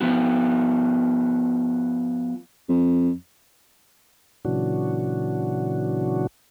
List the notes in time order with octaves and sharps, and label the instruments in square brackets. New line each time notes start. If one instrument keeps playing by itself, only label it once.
[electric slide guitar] F3 B3 F#4
[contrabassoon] F2
[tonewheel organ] A#2 C#3 E3 F#3 D4 F#4